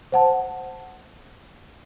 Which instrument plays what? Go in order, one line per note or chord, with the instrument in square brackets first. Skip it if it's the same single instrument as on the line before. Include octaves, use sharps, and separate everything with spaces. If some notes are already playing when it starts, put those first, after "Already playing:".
[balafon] C5 F#5 A5